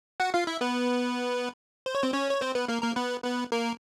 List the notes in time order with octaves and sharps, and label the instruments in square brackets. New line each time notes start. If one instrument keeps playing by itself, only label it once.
[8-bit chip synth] F#4 F#5
F4 F5
E4 E5
B3 B4
C5
C#5
C4 C5
C#4 C#5
C#5
C4 C5
B3 B4
A#3 A#4
A#3 A#4
B3 B4
B3 B4
A#3 A#4